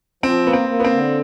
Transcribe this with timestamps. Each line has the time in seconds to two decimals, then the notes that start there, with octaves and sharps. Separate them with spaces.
0.23 F3 C4
0.46 A#3 B3
0.53 C4
0.69 A#3
0.80 B3
0.84 C4
0.92 D3